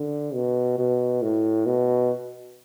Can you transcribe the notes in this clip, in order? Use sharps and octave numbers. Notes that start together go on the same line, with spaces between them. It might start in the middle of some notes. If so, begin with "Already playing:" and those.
Already playing: D3
B2
B2
A2
B2